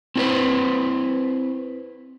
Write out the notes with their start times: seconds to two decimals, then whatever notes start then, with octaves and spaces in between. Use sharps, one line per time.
0.16 C4 E4 F#4 A4 B4 C5